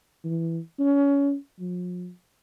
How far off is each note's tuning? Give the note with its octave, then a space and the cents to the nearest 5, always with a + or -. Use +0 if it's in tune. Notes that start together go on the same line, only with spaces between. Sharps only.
E3 +5
C#4 +25
F3 +45